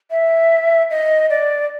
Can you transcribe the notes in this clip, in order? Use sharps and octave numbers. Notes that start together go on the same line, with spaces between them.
E5
D#5
D5